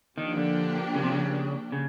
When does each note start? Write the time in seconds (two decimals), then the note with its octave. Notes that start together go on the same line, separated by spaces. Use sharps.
0.17 D#3 F3 A#3 D4 G4
0.37 D3
0.95 C#3
1.03 C3
1.12 C#3
1.72 C#3